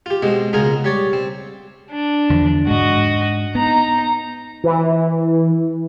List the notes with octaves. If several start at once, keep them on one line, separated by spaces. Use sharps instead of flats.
F4 G4
B2 G#3 C4
C#2 B2 F4 G#4 A#4
G3 C#5 D5
C4
D4
E2 D3 F3
G#2 G#3 F#4 D#5
B3 D#4 A#5
E3